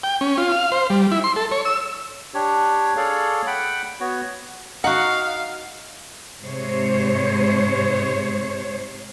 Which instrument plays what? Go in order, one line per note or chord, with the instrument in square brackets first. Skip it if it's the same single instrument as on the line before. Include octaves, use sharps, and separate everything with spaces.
[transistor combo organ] G5
C#4
F4
F5
C5
G3
E4
C6
A4
C#5
E6
[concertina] D4 G4 C#5
G#4 A4 C#5 D5 F5
F#5 G5 B5
B3 F#4 C#5
[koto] D#4 F#4 [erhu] F5 [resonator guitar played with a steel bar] F#5
[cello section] G#2 C3 G#3 C5 C#5